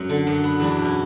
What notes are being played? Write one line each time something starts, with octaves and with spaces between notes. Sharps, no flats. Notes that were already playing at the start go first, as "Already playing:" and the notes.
Already playing: F#2 F#3 C#4
D3
F#2
B3
E2 B3 D4
B2
C#4 E4